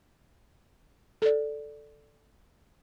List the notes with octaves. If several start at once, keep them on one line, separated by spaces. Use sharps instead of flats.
A4 D5